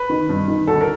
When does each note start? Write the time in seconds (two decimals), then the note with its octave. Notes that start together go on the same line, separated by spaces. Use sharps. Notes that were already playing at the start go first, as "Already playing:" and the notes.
Already playing: B4
0.10 D#3
0.29 G2
0.48 D#3
0.67 D2 A4
0.81 A#4